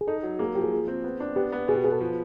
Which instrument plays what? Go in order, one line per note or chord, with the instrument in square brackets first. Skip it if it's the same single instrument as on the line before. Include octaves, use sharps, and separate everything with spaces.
[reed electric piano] G#4
[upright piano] D#4 [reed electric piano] A4
[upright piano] F#3
[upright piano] A#3 [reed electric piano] G#4
[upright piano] F3 [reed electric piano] G4
[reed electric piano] G#4
[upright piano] F3
C4
B3
D4
[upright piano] B3 [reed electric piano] G4
[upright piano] B3
[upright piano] B2 [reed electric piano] G#4
[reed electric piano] G4
[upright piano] B3 [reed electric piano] G#4
[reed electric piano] A4
[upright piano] F3